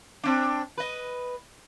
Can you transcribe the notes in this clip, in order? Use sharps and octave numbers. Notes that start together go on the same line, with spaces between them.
C4 D4
B4 D#5